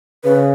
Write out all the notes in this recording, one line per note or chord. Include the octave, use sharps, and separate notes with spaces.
C#3 B4